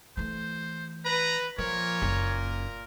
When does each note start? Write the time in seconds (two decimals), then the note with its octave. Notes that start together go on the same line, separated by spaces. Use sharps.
0.17 E3 A3 C5
1.05 B4 A#5
1.58 A#2 F3 A#4 C#5
2.02 F#1 C#4